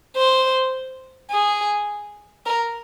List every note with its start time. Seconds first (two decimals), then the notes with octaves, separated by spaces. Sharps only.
0.16 C5
1.31 G#4
2.46 A#4